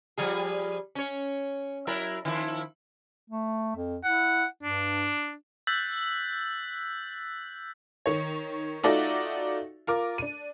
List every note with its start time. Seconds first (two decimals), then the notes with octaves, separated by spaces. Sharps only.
0.17 F3 G3 G#4
0.95 C#4 C#5
1.87 F#3 E4 A#4
2.25 D#3 F3 E4
3.30 A3
3.76 F2
4.04 E4 F#5
4.63 G2 D4
5.67 E6 F#6 G6 A6 B6 F#7
8.06 D#3 C#5
8.83 A3 D#4 F4 F#4 D5 E5
9.87 F4 A#4 D6
10.18 D4 D#7